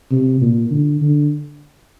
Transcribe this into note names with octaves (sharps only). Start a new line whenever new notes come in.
C3
A#2
D3
D3